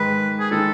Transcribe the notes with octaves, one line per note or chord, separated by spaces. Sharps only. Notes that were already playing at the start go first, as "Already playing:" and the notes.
Already playing: G#2 D#3 G#3 B4
G#4
D#3 G#3 A4